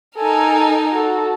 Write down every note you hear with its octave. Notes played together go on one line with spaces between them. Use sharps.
D#4 A4 A#4 G#5
F#4 A4